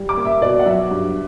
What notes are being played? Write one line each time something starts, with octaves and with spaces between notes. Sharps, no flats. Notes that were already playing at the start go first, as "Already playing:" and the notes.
Already playing: G3
D6
A#3
E5
B2 D5
F#5
F#3 E5
G2